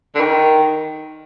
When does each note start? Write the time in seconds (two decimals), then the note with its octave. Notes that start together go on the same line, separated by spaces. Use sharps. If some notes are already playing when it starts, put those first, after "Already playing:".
0.15 D3
0.20 D#3